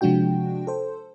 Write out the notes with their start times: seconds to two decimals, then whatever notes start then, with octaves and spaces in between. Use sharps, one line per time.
0.01 C3 F3 G#3 D4 F#4 G5
0.67 A4 C5